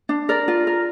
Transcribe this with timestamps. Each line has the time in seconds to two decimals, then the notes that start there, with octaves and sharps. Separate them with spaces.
0.09 D4
0.29 A#4 D5
0.48 F4
0.67 A#4